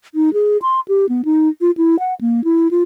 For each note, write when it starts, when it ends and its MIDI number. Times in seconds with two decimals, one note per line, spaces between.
0.15 0.33 63
0.33 0.57 68
0.62 0.80 84
0.88 1.06 67
1.09 1.22 59
1.25 1.49 63
1.61 1.71 65
1.77 1.98 64
1.99 2.14 78
2.21 2.44 58
2.44 2.68 64
2.71 2.83 65